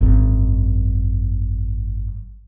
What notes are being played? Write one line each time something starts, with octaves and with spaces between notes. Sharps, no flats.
G#1 F#2